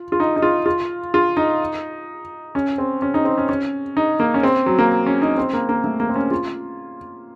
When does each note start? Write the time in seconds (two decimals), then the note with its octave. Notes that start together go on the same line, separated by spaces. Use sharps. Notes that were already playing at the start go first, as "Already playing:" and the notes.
Already playing: F4
0.12 F4
0.20 D#4
0.36 D#4
0.42 F4
0.66 F4
1.14 F4
1.37 D#4
2.55 C#4
2.78 C4
3.02 C#4
3.14 D#4
3.25 C4
3.38 C#4
3.49 C#4
3.97 D#4
4.20 A#3
4.34 C#4
4.43 C4
4.66 F#3
4.78 A#3
5.06 C#4
5.22 D#4
5.37 C4
5.53 A#3
5.69 A#3
5.84 A3
6.00 A#3
6.09 C4
6.16 C#4
6.31 F4